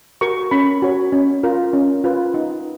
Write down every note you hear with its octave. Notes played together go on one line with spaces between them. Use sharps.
F#4 A#4 C#6
C#4 B5
F#4 C#5
C#4
F4 A#4
C#4
F4 B4
D#4